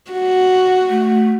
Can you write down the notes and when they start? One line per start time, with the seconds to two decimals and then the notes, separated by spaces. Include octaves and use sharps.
0.11 F#4
0.90 A3